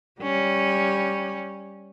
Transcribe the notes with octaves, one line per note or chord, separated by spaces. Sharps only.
G3 C#4